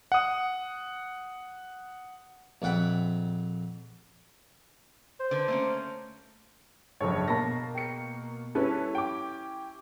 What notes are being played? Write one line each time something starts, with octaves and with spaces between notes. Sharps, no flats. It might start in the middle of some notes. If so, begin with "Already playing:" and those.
F#5 D#6
A#1 F2 F#5 G5 B5
C5
D3 B4
A3 A#3 C#4
F#1 G#2 D4 G#4 A4 C#5
B2 A#3 A5 B5 A#6
G5 C#7
G3 C#4 E4 A4 B4
G5 D6